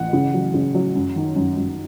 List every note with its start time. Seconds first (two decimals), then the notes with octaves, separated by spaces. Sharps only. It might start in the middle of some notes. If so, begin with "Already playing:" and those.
Already playing: A1 F#5
0.13 C#3
0.34 F#3
0.54 C#3
0.74 F#3
0.95 F#2
1.16 D#3
1.36 F#2
1.57 F#2